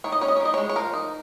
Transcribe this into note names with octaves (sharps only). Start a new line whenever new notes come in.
D#3 C#5
D#5
C#4 C#5
D#5
C#5
D#3 D#5
G#3 C#5
C#5
F3 A#4
D#4